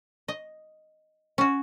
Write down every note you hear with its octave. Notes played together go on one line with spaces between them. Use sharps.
D#5
C#4 F#4